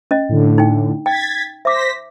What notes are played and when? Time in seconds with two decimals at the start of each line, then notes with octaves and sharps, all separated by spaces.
0.11 C#4 D#5
0.29 A2 D3
0.58 D#4 G5
1.06 G5 G#6 A6 B6
1.65 C5 E5 D6 A#6 B6